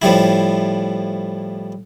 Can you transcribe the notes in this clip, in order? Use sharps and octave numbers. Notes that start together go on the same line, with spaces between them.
A2 F3 G3 E4